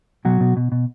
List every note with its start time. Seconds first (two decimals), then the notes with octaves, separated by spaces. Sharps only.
0.25 B2 F#3 F#4
0.41 B2
0.57 B2
0.72 B2